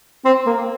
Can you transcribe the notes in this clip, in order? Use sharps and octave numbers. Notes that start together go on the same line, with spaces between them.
C4
A#3